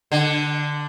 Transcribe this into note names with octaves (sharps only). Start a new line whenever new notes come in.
D3